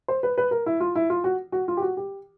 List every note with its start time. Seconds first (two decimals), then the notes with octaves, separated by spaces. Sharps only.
0.08 C5
0.23 B4
0.38 B4
0.51 A#4
0.66 E4
0.80 F4
0.95 E4
1.10 F4
1.24 F#4
1.52 F#4
1.68 F4
1.77 G4
1.82 F#4
1.97 G4